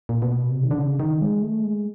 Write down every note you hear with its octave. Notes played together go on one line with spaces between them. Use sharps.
A#2
B2
C3
D#3
D3
C#3
D#3
G#3
A3
G#3